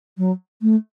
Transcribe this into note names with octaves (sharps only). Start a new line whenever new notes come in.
F#3
A3